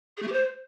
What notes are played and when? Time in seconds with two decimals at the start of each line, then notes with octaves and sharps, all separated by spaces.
0.17 G#4
0.22 A3
0.27 G4
0.32 C5